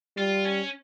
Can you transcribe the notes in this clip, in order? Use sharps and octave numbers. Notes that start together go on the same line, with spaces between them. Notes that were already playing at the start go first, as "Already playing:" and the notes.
G3 F4
C#4